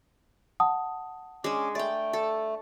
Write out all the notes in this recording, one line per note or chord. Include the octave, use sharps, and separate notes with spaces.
F#5 A5 D#6
G#3 C#4 D4 D6
A3 D5 G5
A4